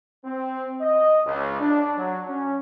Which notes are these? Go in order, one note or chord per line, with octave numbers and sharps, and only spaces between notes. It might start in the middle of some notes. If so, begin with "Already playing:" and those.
C4
D#5
C#2
D4
F#3
C#4